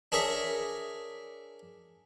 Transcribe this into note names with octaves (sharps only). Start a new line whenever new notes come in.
D4 G#4 A#4 C#5 E5